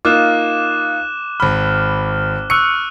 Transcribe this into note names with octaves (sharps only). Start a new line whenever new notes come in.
A#3 D#4 F4 D6 F#6 E7
G#1 B5 F6
C#6 E6 F#6 C#7